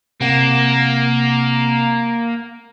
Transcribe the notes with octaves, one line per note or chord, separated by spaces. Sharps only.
C3 A#3 F#5 E7